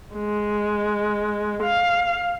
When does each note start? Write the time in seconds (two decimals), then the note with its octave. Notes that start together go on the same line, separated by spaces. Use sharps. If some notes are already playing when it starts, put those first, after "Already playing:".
0.15 G#3
1.63 F5